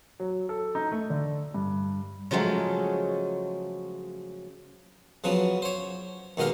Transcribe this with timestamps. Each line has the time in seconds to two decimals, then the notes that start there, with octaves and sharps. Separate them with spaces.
0.20 F#3
0.49 A4
0.75 D#4
0.92 A3
1.10 D3
1.54 G2
2.31 C#3 F3 F#3 G#3 A3
5.24 C#3 F3 F#3 B3
5.62 C5 C#5
6.37 D#2 B2 G#3 A#4 F5